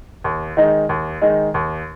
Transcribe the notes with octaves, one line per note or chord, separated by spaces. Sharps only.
D#2
D#3 G#3 D#4
D#2
D#3 G#3 D#4
D#2